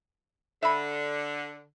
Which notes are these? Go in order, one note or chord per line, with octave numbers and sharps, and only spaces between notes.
D3 E5 B5